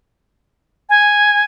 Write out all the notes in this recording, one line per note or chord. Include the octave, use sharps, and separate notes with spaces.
G#5